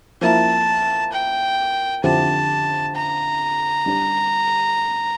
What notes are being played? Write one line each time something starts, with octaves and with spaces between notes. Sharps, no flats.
F3 A#3 E4 A5
G5
D3 F3 C4 E4 G4 A5
A#5
G3 D4 G4